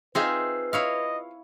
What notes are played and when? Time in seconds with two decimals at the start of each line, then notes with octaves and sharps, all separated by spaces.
0.15 C4 D#4 F4 G#4 B4 E5 F5
0.73 E4 C#5 D#5 F5